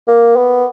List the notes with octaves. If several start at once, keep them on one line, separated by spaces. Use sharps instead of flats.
A#3
B3